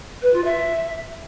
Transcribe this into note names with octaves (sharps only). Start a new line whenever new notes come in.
B4
F4
E5